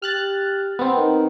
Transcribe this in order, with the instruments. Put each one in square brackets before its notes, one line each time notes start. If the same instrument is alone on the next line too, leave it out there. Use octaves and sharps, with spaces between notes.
[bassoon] G4 [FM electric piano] F6 F#6 A6
[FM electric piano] B3 C4
[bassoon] D#3